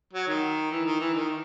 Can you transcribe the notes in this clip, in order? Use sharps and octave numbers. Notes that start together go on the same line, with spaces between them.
F#3
D#3
E3
D#3
E3
D#3